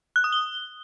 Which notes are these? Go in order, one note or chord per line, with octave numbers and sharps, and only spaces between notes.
F#6
D#6
G7